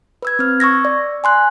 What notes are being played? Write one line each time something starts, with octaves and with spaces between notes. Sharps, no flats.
B4 E6 G#6
C4 F6
C#6 E6 G#6 A#6
D5
G#5 C6 F#6